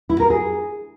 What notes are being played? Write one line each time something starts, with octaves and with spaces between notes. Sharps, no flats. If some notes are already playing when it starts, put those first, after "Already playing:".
E4
A#4
G#4